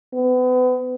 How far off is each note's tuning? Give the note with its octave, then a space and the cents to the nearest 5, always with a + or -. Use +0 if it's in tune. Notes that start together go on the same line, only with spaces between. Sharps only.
B3 +35